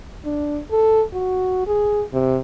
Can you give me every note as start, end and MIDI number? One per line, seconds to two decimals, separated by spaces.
0.25 0.60 62
0.71 1.03 69
1.14 1.62 66
1.67 2.03 68
2.13 2.38 48